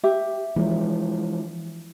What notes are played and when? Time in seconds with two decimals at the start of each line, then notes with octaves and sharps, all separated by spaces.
0.03 G4 E5
0.56 E3 F3 G#3